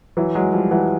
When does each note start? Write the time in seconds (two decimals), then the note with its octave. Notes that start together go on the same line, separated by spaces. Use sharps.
0.17 E3 F#3
0.35 F#3 G#3
0.53 F3 G3
0.71 E3 F#3